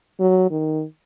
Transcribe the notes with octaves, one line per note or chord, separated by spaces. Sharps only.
F#3
D#3